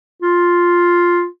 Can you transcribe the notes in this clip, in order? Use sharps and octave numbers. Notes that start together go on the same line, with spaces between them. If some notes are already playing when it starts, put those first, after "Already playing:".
F4